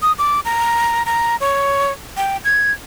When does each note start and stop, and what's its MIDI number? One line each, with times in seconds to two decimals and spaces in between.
0.02 0.12 87
0.19 0.40 86
0.45 1.03 82
1.06 1.36 82
1.40 1.92 73
2.17 2.37 79
2.45 2.72 92